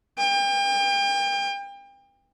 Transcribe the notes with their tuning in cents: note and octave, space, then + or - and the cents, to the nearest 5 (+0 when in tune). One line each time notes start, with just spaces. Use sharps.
G5 +35